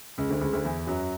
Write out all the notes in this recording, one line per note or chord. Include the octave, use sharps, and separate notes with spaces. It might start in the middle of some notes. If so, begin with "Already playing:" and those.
C#2 C#3
D2 D3
C#2 C#3
D2 D3
E2 E3
F#2 F#3